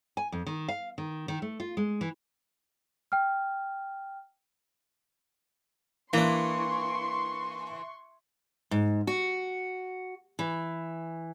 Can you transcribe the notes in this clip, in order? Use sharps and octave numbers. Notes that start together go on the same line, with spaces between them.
G#5
F2
D#3
F5
D#3
D#3
A3
F4
G#3
E3
G5 F6
E3 A#3 D4 C6 C#6
G#2
F#4
E3